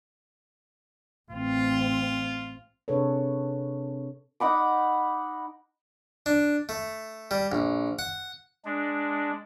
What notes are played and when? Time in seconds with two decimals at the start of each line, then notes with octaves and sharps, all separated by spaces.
1.31 A1 C4 F4
2.88 C3 D4 G#4 A4 B4 C#5
4.40 D#4 F#5 B5 D6
6.26 D4
6.69 A3
7.31 G3
7.52 A#1
7.99 F#5
8.65 G#3 D4